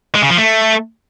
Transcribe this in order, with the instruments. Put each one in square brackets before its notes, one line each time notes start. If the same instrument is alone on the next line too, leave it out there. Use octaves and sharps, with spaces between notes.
[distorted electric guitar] G#3
C#3
F3
A3